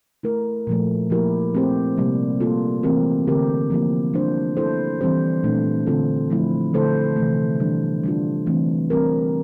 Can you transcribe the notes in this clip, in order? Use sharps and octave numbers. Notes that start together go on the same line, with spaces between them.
A3 E4 A#4
A#2 F3 A3
F3 A#3 E4 G4 A#4
A3 C4 G4 C5
C3 G3 A#3
A#3 F4 A4
E3 A3 C4 G4 A#4
D3 A3 C4 G4 A#4
F3 A#3 E4 G4
G3 D4 F4 C5
A3 E4 A4 C5
E3 G3 C4 G4 C5
A#2 A3 D4
D3 A3 C4 F4 A4
F3 A3 E4
D3 A3 E4 A4 C5
C3 E3 A3
E3 G3 D4
G3 D4 F4
E3 A3 C4
G3 C4 G4 A#4